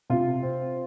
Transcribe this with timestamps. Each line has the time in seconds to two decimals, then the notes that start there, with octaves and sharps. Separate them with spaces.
0.10 C3 F4
0.43 C4